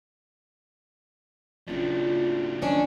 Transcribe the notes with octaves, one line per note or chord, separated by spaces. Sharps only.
F#1 F#3 D4 F4
D#3 C#4 D4